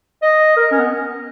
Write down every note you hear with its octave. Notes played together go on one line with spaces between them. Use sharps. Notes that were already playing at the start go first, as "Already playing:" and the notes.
D#5
A#4
C#4
B3